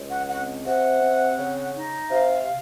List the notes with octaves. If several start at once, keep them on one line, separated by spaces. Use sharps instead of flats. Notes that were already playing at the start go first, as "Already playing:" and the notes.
Already playing: C#2
F#5
C4 F#5
C3 F#5
C4
C#3
D#4
C3 F5
C3